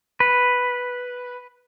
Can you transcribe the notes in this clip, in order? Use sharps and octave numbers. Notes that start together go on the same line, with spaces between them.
B4